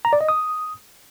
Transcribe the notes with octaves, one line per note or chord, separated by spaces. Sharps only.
A#5
D5
D#5
D#6